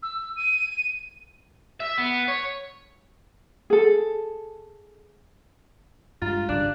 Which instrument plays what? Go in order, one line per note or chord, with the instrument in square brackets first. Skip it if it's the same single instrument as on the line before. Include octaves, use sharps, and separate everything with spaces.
[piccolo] E6
D#7
[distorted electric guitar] E5
B3
C#5
[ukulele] G#4 A4
[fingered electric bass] G2 G#3 [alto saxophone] F4 [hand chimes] F5 A#5 A6
[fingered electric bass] G#1 C#2 G3 [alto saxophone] D4 [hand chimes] F5 D6 F#6